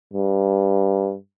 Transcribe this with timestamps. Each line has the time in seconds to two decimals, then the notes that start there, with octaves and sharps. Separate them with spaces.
0.13 G2